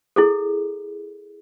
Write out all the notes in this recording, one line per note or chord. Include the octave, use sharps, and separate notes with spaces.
E4 G#4 A4